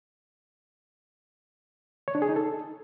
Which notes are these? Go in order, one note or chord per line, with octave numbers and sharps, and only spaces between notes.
C#5
D4
G#4
D#4
A4